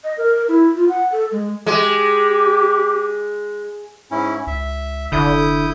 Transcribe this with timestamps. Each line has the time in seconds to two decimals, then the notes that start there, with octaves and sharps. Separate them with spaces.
0.04 D#5
0.18 A#4
0.48 E4
0.76 F4
0.89 F#5
1.12 A4
1.32 G#3
1.67 G#3 G4
4.11 G#2 C#4 E4
4.47 C#2 E5
5.12 F1 D3 E4 D#6 G6